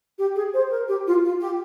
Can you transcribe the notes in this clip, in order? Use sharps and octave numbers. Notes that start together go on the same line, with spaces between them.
G4
G#4
C5
A#4
G4
F4
F4
G4